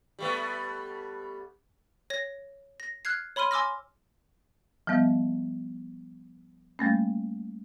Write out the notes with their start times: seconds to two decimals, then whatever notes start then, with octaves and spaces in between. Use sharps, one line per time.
0.19 G3 A3 B3
2.10 C#5 A#6
2.80 A#6
3.05 F6 F#6 G#6 C7
3.36 C#5 B5 C6 F6 D#7
3.51 G#5 C6 D6 E6 F6 A#6
4.87 F3 G3 B3 E5
6.79 G3 A3 A#3 C#4